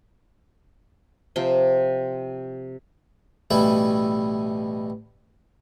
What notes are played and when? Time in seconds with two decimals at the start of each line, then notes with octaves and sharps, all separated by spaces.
1.36 C3 F3 G5
3.50 A1 B2 G3 E4 E5